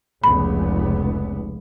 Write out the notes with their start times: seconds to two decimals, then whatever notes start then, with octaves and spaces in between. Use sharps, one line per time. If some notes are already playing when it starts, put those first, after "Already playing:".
0.24 F1 C#2 B3 B5